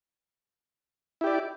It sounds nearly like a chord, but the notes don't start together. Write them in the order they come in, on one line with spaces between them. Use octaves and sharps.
E4 G4 D5